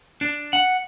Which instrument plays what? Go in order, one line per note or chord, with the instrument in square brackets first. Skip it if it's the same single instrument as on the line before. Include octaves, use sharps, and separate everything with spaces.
[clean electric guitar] D4
F#5